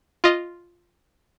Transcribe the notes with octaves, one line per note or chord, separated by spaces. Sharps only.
F4 D#5